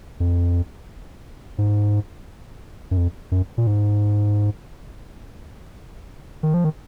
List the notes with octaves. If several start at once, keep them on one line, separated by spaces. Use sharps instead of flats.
F2
G#2
F#2
F2
F#2
A#2
G#2
D#3
F3
D#3